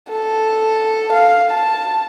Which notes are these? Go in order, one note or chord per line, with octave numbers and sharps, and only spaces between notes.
A4
F5
A5